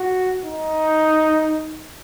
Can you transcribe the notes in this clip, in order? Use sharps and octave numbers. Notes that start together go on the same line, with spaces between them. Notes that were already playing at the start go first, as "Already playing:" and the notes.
Already playing: F#4
D#4